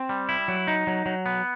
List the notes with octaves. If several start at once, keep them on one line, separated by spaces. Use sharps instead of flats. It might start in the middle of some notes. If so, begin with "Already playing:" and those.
Already playing: C4
G3
E4
F#3
D#4
F#3
F#3
B3